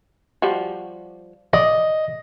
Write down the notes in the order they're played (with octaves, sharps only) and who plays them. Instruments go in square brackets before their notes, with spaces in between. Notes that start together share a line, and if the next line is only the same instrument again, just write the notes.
[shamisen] F3 G3 F#4
[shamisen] D5 [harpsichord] D#5